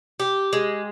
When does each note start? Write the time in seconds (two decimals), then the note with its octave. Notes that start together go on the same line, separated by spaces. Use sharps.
0.20 G4
0.53 G#3